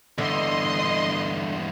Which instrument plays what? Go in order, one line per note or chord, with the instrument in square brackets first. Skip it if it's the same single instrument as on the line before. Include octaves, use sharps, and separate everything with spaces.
[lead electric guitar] E2 G2 [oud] D3 [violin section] D#5 C6